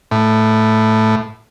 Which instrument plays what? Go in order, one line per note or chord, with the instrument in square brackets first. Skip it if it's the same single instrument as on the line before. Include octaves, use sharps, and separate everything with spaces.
[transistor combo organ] A2